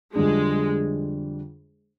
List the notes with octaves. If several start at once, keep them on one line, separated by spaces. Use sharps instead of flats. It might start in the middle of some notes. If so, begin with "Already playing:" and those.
F2 D3 G3 G#3 D4